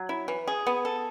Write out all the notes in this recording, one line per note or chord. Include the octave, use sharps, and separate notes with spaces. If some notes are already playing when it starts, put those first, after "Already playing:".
Already playing: F#3
E4
E3
G#4
B3
A4